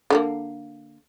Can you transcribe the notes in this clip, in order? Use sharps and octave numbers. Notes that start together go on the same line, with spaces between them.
D3 G3 A#3